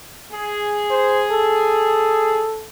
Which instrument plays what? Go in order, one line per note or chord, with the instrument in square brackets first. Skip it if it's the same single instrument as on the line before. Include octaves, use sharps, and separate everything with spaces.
[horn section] G#4
[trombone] C5
A4